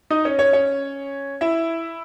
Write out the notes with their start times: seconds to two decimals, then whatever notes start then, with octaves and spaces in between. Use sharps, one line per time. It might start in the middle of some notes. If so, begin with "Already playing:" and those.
0.10 D#4 D#5
0.25 C#4 C#5
0.39 C#4 C#5
0.53 C#4 C#5
1.41 E4 E5